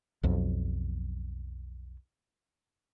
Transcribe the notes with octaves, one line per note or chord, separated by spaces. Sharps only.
B1 F2 F#3